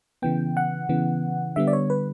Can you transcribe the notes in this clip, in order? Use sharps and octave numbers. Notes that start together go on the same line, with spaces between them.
C#3 E3 B3 G5
F#5
C#3 E3 B3
D3 G3 B3 E5
D5
C#5
B4